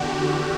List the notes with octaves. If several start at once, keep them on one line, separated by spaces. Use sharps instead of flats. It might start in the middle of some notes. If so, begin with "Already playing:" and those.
Already playing: E2 D3 F#4 G4